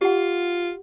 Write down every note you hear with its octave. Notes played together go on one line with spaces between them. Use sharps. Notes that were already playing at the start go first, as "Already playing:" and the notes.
F4 G4 F#5